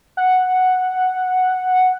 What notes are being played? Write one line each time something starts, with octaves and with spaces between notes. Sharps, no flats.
F#5